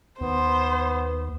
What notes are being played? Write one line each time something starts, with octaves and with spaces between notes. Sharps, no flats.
D#2 B3 C5